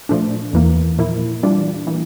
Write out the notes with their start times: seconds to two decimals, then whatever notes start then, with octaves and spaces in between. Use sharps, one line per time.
0.09 A#2 F3 A3 D4
0.53 E2 E3 A#3
0.99 A#2 F3 A#3 E4
1.43 E3 G3 D4 F4
1.87 E3 A#3